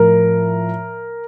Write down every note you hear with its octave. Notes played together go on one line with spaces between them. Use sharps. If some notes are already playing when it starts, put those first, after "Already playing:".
Already playing: A2 F3 A#4